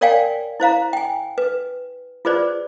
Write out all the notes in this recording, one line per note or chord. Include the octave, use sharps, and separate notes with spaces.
A#4 C#5 D5 F5 G5 G#5
E4 C5 F5 A#5
G5 G#5
B4
F4 G#4 B4 C5 D5